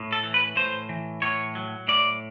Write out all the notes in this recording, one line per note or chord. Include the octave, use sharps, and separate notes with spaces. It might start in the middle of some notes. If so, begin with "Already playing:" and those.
Already playing: A2
A4
E3
B4
A2 C5
E3
A2 C#5
F#3
A2 D5